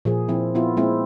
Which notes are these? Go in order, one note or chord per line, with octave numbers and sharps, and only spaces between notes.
A#2 F3 G#4
F3 C4 E4
B3 E4 F4
G#3 A#3 C4 E4